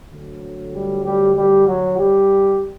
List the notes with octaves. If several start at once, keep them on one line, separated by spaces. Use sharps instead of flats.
D2 D3 F#3
G3 G4
G3 G4
G3 G4
F#3 F#4
G3 G4